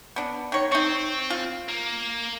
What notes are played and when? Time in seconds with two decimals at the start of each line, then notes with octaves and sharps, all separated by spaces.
0.16 B3 D4
0.52 D#3 C#5
0.72 C4 D#4 C#6
1.30 F4
1.69 A#3